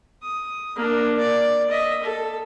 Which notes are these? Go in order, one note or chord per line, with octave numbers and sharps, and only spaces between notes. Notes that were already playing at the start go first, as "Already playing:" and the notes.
D#6
A#3 D4
D5
D#5 E5
A4